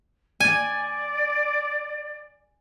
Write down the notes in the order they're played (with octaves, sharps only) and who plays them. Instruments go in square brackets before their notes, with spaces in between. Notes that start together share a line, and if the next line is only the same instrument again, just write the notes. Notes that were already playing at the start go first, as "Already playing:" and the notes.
[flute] D5 [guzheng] G#5